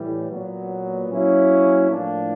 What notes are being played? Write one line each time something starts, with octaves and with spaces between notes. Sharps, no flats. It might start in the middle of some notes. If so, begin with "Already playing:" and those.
Already playing: A2 E3 G3
A#2 F#3 B3
F#3 A#3 C#4 E4
A2 F3 A#3 D4